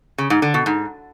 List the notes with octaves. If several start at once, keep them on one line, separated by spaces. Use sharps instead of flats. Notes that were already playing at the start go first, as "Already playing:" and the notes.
C#3
G#2
D3
B2
G#2